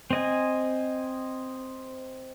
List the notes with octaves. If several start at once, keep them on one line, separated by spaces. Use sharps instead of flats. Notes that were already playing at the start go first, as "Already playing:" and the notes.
C4 D#5 G#5